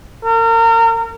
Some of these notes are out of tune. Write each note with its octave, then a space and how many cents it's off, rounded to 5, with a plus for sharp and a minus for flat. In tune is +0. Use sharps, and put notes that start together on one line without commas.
A#4 -35